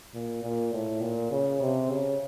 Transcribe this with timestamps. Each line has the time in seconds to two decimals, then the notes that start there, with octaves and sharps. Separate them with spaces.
0.13 A#2
0.43 A#2
0.72 A2
1.01 A#2
1.31 C#3
1.60 C3
1.90 C#3